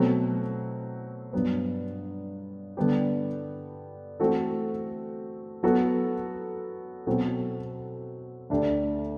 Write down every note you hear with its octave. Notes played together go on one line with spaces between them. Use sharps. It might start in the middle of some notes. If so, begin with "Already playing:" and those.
Already playing: B2 F#3 A3 C4
G2 F#3 B3
D3 G3 B3 D4 G4
E3 A3 C4 F#4 A4
F#3 B3 F#4 A4
B2 F#3 C4 F#4 A4
D2 D3 A3 D4 G4